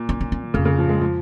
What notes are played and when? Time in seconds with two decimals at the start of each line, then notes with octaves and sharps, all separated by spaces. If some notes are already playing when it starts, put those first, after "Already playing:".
Already playing: A#2
0.09 C#4
0.21 C#4
0.32 C#4
0.43 D#3
0.54 F2 C#3
0.65 C#3
0.78 F3
0.89 G#3
1.01 F3